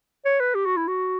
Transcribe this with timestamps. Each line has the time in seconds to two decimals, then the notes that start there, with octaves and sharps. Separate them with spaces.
0.25 C#5
0.40 B4
0.55 G4
0.66 F#4
0.77 E4
0.88 F#4